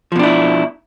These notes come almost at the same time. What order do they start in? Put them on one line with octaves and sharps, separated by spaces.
F3 B2 D4 E4